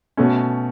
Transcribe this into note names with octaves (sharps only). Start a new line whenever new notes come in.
B2 A3 C#4